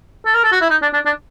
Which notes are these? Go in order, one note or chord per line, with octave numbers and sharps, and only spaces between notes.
A4
A#4
A4
F#4
E4
D#4
D4
D4
D4